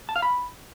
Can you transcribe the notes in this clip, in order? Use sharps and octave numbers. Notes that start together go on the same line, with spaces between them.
A5
F5
B5